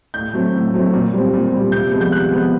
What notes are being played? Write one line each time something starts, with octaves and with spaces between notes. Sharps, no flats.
A2 G6
F#3 A3 C4
A2
F#3 A3 C4
A#2
G3 C4
A#2
G3 C4
C3 G6
F3 G#3 B3
G6
C3 F#6
F3 G#3 B3